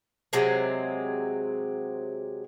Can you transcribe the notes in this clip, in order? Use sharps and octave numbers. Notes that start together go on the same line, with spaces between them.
C3 F#3 G#3 C4